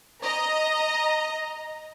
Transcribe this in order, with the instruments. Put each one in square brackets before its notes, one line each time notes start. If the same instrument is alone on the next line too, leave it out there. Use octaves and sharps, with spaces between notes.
[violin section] D#5 A#5